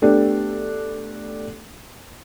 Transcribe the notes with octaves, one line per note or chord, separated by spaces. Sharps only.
A3 B3 D4 G4 A4